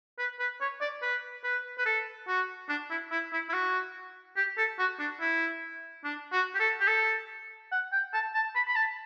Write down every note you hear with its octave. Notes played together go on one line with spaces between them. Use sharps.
B4
B4
C#5
D5
B4
B4
B4
A4
F#4
D4
E4
E4
E4
E4
F#4
G4
A4
F#4
D4
E4
D4
F#4
G4
A4
G4
A4
F#5
G5
A5
A5
B5
B5
A5